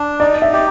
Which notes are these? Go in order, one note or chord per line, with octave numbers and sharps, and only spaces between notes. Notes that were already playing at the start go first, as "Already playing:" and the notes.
Already playing: D4
D#4 D5
E5
G4